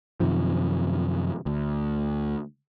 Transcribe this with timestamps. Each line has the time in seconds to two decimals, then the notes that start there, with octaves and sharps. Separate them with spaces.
0.20 F#2 C3 D#3 F3
1.46 D2